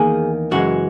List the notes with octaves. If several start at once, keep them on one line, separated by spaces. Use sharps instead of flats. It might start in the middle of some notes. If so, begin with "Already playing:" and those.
Already playing: E2 D#3 A#3 G#4
F#2 C#3 E3 G#3 F#4